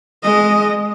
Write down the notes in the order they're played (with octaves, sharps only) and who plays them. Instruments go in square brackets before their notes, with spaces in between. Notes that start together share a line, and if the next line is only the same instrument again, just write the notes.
[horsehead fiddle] G#3 D#5